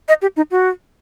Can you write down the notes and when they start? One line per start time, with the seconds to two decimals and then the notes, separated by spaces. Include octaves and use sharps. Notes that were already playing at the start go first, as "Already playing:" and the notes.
0.08 D#5
0.22 G4
0.37 D#4
0.51 F#4